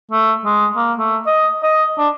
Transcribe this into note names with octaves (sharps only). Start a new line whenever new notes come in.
A3
G#3
A#3
A3
D#5
D#5
D4